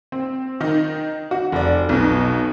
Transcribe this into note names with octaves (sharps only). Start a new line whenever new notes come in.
C4
D#3 D#4
F#4
F1 D5
B1 B2